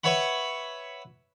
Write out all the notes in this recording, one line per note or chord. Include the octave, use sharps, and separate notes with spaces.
B4 C#5 E5 F#5 B5